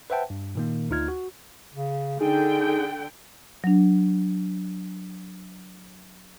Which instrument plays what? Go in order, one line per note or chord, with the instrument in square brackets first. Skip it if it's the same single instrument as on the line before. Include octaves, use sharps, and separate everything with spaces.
[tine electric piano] B4 C5 E5 F#5 G5 A5
G2
A#2 D#3 A#3
D2 D#4 F4 F6 G#6
F#4
[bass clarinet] C#3
[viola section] D3 G5 [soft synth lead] D#4 [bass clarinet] G#4
[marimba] F#3 D4